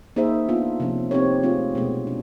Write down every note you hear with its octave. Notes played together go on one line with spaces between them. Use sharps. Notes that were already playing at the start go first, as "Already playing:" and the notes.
A#3 D#4 G#4 C5 E5
B3 D4 F4
C3 F3 A#3 C#4
C4 D#4 G4 A#4 C#5
A3 C4 F4 G#4
B2 G#3 B3
D4